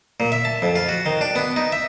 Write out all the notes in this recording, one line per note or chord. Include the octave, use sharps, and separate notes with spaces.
A#2
E5
A5
F2
F4
F#4
D#3
D4
B3
D#4
E5